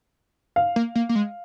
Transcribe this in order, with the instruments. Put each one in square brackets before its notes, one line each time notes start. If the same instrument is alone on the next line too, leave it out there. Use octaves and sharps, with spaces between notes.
[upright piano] F5
[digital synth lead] A#3
A#3
A#3
G#3